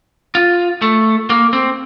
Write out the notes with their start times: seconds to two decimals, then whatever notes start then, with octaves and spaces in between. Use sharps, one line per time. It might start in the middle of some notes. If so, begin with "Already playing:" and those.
0.35 F4
0.82 A3
1.30 A#3
1.53 C4